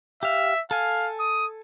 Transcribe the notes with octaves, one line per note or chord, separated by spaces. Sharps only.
G4 E5 F5
A4 F5 G#5
D#6